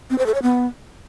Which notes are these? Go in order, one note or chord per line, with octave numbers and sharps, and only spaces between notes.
C4
C5
A4
C#5
B3